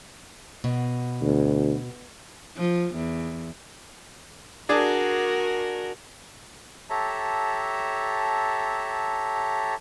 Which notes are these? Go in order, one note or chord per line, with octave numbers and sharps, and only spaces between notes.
B2
D2
F3
E2
D4 F#4 G#4 A#4 D5
G4 A4 C#5 E5 A5 A#5